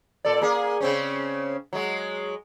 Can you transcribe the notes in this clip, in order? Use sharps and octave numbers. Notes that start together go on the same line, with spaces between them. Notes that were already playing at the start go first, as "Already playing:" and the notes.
A#2 A4 D5
A#3 G#4
C#3 C4 C#4
F#3 G#3